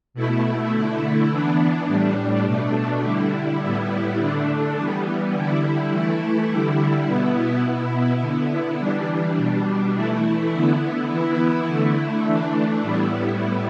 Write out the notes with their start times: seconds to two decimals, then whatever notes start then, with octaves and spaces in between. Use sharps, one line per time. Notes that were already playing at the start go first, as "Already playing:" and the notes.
0.14 B2 A3 E4
0.72 D3 A3 E4
1.30 E3 B3 D4
1.87 A2 G3 D4
2.45 B2 A3 D4
3.02 D3 G3 E4
3.61 A2 G3 B3 E4
4.18 D3 A3 D4
4.75 E3 G3 B3
5.32 D3 G3 E4
5.90 E3 A3 E4
6.48 D3 G3 E4
7.07 B2 B3 E4
7.64 B2 B3 E4
8.21 D3 B3 E4
8.79 E3 G3 D4
9.37 B2 G3 D4
9.94 E3 A3 E4
10.52 D3 B3 E4
11.09 E3 B3 E4
11.67 D3 A3 E4
12.26 E3 A3 D4
12.82 A2 G3 B3 E4